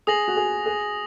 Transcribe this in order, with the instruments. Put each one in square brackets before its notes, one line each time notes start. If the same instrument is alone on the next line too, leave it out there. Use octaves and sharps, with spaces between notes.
[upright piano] G#4 [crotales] D#6 A#6 F#7
[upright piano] F#4
G#4
G#4